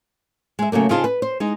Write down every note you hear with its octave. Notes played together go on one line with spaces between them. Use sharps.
G#3 E5
C#3 F#3 A3 A#3
C#3 C4 D#4 F4 G#4 A5
B4
C5
G#3 D#4